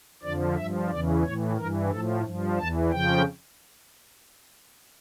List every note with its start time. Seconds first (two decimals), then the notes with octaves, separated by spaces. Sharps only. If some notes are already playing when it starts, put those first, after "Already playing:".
0.23 F2 D3 F3 D5
0.56 G2 F3 E5
0.90 E2 C#3 E3 D5
1.23 A2 E3 C#5
1.57 G2 E3 A#4
1.91 A2 F3 A4
2.24 G2 F3
2.58 E2 E3 A5
2.91 F2 C#3 F3 G5